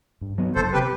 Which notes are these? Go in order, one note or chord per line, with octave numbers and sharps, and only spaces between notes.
G2
F#3 B3
F#1 A4 C5
C3 G4 B4